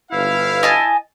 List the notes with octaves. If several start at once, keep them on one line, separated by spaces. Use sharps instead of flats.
G1 E4 B4 F5
D#5 G#5 A5